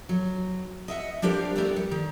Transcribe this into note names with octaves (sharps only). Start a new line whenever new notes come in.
F#3
D#5 E5 F#5
G3 D4 G4 A#4 C5 F5
A3 B3 E4 G4 A#4
G3
D#3